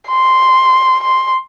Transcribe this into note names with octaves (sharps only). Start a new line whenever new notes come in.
C6
C6